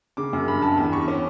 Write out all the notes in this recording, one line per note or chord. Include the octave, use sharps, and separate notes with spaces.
C#3 D6
F#2
G2 B5
G2 A5
E2 B5
E2 C#6
C#4 D6